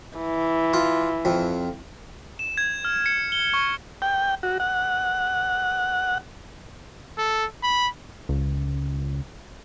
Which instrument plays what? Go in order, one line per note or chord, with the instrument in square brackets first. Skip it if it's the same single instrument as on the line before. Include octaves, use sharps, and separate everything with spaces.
[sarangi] E3
[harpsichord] F4
F2
[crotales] E7
G#6
F6
C#7
G7
C#6
[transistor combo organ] G5
F#4
F#5
[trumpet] A4
B5
[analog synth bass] C#2